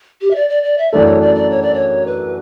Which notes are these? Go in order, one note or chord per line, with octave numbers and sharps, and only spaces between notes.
G4
E5
D5
D5
D5
E5
F#2 E3 A3 D4 A4 D5
C#5
D5
D5
C#5
D5
C#5
B4